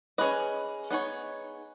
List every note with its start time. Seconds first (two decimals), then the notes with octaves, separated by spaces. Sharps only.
0.18 C#4 G#4 B4 D#5
0.90 B3 D#4 G#4 C#5